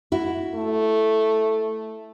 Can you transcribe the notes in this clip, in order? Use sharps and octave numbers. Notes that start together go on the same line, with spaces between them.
E4 F#4
A3